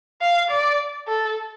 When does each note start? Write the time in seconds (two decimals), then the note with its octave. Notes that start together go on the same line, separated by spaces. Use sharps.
0.21 F5
0.50 D5
1.08 A4